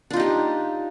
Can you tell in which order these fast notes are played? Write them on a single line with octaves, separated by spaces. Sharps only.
D4 F4 D#4 G4